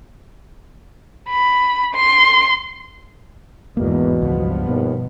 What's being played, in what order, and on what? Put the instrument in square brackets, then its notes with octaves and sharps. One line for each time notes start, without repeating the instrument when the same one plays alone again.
[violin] B5
C6
[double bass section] G#1 E2 G#2 [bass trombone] B2 [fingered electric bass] A#3
[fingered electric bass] C#2 [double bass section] G2 F3 B3
[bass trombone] D#2 [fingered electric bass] B2